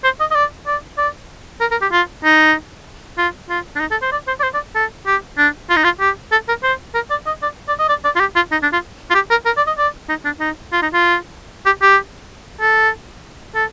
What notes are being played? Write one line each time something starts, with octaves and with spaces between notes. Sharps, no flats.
C5
D#5
D#5
D5
D5
D5
A#4
A#4
G4
F4
D#4
F4
F4
D4
D#4
A4
C5
D5
C5
D5
C5
D5
A4
G4
D4
F4
D#4
F4
G4
A4
A#4
C5
A#4
D5
D#5
D5
D5
D#5
D5
D5
F4
G4
F4
D#4
D4
F4
F4
G4
A#4
A#4
D5
D#5
D5
D#4
D4
D#4
F4
D#4
F4
G4
G4
A4
A4